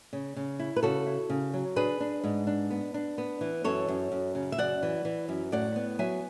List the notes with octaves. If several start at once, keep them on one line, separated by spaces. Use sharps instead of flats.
C#3
C#3
E4
B4
C#3 F#4 A4
E4
C#3
F#3
D4 G#4 B4
D4
G#2
D4
B3
D4
B3
E3
F#2 A4 C#5
F#2
F#2
C#3
E5
F#2 D5 F#5
E3
E3
F#2
A2 D5 F#5
B3
F#3 E5 G#5